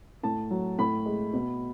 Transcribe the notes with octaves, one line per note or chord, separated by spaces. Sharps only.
A2 A5
F#3
A2 B5
G#3
B2